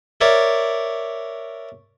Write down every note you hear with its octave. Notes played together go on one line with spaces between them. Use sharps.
A#4 C#5 D5 E5